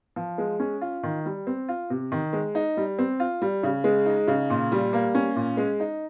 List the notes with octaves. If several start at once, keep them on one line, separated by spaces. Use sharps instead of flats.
F3
G#3
C#4
F4
D#3
G3
C4
F4
C3
D#3
G#3
D#4
G3
C4
F4
G3
C#3
G#3
D#4
C#3
A#2
G3
A#3
C#4
A#2
G#3
D#4